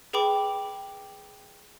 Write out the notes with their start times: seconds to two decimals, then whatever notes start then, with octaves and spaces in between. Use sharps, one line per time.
0.13 G#4 B4 G5 B5 D6